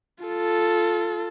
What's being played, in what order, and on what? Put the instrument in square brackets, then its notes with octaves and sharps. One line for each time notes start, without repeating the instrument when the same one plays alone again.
[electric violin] F4 A4